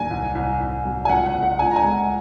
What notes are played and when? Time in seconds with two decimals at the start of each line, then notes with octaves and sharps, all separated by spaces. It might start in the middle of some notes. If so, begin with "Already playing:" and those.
Already playing: D#2 F#3 G#5
0.11 C2
0.35 C2
0.60 C2
0.85 F#3
1.05 G#5
1.09 C#2 F#5
1.26 F#5
1.35 C#2
1.43 F#5
1.59 C#2 G#5
1.71 A#5
1.76 G#5
1.84 G#3